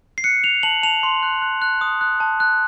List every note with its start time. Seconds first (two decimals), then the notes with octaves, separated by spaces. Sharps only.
0.18 C7
0.24 F#6 C#7
0.43 F#6 F7
0.63 A5 F#7
0.83 A5 F7
1.03 C6
1.23 F#6
1.42 F#6
1.62 F#6
1.81 D#6
2.01 F#6
2.20 A5
2.40 F#6